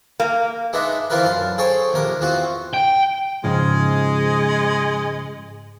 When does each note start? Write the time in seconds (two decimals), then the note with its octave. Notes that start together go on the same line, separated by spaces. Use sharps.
0.20 A#3
0.73 G#3 B3 D4 D#4 D#5 E5
1.10 E3 C4 E4 F4 A#4 B4
1.24 F#2 F5 A5
1.58 G#4 A4 C5 C#5 G5
1.92 A#1 D#2 C3 A#4
2.21 E2 C4 F4 F#4
2.74 G5
3.44 G#2 C#3 F3 G#3